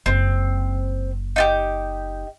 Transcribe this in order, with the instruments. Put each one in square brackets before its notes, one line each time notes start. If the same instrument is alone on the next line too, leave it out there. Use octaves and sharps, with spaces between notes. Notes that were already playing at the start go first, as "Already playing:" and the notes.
[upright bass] F#1 [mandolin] C4
[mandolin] D#4 F4 G4